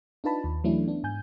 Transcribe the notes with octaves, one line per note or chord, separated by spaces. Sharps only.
D4 D#4 F4 B4 A5 B5
D#2
E3 F#3 A3 C#4 D4 E4
B3 D4
G#2 G#5 G6